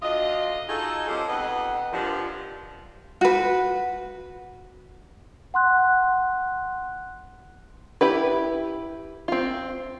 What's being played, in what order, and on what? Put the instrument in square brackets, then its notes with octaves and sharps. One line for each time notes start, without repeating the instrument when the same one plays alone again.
[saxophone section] D2 F4 D#5
D#4 F4 F#4 G#4 A4
F3 G#3 C4 C#4 G4
F2 B3 D#4 D#5 F#5
G2 A#2 F3
[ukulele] F#4 B4
[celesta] F#5 C6 F#6
[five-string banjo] E4 G4 B4
C4 F4